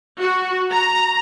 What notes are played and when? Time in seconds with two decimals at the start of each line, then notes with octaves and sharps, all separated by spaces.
0.20 F#4
0.72 A#5